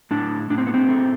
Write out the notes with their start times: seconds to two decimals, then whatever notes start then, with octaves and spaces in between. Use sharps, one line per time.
0.11 A2 D4
0.50 A2 D4
0.58 C4
0.67 B3
0.74 C4
0.89 A3